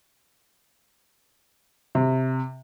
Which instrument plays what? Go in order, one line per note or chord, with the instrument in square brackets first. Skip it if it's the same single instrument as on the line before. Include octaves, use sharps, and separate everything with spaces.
[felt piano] C3